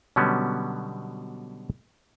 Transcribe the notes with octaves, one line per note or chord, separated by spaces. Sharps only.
B2 D3 F#3 G3 B3 C#4